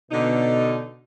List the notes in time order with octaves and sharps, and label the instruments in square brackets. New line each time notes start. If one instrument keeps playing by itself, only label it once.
[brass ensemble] B2 [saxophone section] D3 D#4